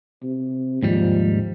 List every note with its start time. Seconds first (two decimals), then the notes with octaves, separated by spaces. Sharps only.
0.23 C3
0.83 D#2 G#2 F3 G3